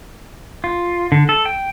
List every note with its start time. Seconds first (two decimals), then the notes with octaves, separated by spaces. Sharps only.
0.64 F4
1.12 D3
1.29 A4
1.45 G5